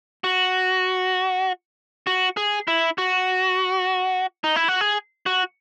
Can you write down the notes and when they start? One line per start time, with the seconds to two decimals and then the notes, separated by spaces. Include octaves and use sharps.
0.24 F#4
2.07 F#4
2.37 G#4
2.68 E4
2.98 F#4
4.44 D#4
4.56 E4
4.68 F#4
4.81 G#4
5.26 F#4